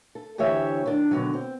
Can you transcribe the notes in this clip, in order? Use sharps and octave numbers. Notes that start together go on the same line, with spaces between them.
A4
D2 E3 G4 C#5 E5
D#3 D4
B2 D3 D#3 F#3
C4